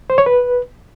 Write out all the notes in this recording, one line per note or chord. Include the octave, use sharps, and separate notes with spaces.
C5
C#5
B4